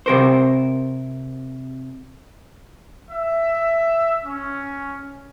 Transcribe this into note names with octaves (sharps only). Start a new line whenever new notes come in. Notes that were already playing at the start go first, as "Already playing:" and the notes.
C3 A#4 C5
E5
C#4